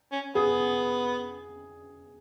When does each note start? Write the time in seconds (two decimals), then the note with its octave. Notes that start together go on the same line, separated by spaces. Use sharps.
0.12 C#4
0.35 B3 G#4